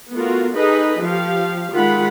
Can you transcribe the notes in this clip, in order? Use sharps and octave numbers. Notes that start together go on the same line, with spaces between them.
A3 B3 F4 F#4 A#4
D#4 G#4 A4 B4 D#5
F3 G4 F5
D#3 G#3 F4 F#5 B5